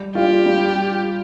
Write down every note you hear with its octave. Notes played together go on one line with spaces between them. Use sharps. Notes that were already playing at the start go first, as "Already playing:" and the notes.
Already playing: G3
D4 F4 G4
G3